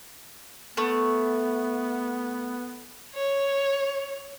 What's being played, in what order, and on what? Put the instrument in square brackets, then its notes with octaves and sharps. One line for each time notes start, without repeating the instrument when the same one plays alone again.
[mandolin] A3 [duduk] B3
[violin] C#5